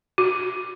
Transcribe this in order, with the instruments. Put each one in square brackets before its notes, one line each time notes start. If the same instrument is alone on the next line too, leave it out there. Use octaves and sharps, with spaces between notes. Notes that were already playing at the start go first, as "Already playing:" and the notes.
[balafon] F#4